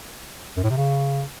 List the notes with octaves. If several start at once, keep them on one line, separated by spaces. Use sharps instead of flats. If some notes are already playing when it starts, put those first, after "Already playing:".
F#2
A2
C3
C#3